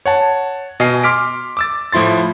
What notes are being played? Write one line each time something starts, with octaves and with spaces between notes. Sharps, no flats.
C#5 F#5 A5
B2 D#5 G#5 C7
C6 D6 F6 B6 D7
D6 E6 A6
A2 F3 E4 C6 A6